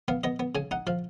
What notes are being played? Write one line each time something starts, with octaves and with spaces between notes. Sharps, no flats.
B3 F5
B3 D#5
B3
C#3 G#5
D#4 F#5
F3 F5